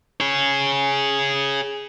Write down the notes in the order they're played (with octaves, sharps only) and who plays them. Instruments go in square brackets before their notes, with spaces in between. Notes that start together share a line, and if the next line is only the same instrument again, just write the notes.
[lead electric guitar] G#4 C#5